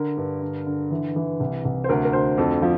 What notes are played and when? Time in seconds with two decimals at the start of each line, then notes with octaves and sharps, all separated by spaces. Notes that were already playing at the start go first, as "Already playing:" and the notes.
Already playing: D3 A#4
0.17 G2
0.42 D3
0.66 D3
0.91 E3
1.16 E3
1.40 C2
1.65 C2
1.84 C5
1.89 D2 A#4
2.05 A#4
2.13 D2 C5
2.38 F2 A4
2.62 F3